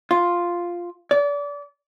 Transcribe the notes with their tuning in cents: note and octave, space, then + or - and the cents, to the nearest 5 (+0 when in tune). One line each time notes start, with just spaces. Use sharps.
F4 +0
D5 -30